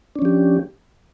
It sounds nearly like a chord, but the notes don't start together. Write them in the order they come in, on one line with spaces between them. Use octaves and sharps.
D4 C#4 F3 G4